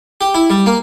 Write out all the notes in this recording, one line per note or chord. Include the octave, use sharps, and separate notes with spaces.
G4
E4
G3
A#3